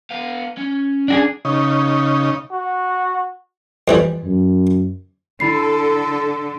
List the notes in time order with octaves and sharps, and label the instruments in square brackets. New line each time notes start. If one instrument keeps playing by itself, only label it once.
[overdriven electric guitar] B3 F5
C#4
[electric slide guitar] D4 F#4 G#4
[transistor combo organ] C#3 D#4
[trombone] F#4
[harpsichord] F2 E3 G3
[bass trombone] F#2
[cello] D3 [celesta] E4 B5 C7 [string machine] A4